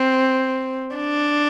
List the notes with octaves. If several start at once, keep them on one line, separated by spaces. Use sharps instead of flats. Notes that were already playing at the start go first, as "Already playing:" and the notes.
Already playing: C4
D4